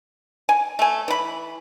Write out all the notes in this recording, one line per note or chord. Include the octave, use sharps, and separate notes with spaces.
G#5
A3 G#5
E3 B5